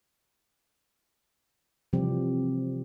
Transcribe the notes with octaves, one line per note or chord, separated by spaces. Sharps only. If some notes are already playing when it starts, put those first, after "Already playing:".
C3 E3 F3 G3 C4 G4